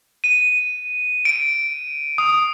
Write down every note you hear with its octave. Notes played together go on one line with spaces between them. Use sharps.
D#7
D7
D#6